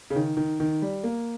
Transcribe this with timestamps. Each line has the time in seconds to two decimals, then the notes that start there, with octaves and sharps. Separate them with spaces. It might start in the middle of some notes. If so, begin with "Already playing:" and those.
0.10 C#3
0.16 D#3
0.37 D#3
0.60 D#3
0.82 G3
1.03 A#3